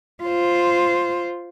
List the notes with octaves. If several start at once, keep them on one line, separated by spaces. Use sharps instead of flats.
F4 C5